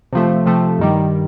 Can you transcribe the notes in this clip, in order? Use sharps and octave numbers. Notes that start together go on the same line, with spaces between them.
C3 F3 A3
C3 F3 A3
G2 D#3 G3